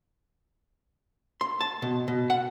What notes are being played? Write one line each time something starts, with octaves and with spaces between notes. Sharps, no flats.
C6
A5
B2
B2
F#5